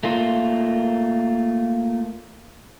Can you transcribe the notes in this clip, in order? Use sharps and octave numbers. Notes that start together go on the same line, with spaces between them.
A3 A#3 F4